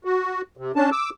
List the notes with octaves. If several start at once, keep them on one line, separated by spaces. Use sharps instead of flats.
F#4
C3
C#4 D4 A5
D6 E6